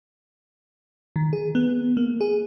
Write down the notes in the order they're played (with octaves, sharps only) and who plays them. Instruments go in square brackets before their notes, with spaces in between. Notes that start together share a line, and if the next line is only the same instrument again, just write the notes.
[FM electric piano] D#3
G#4
B3
A#3
G#4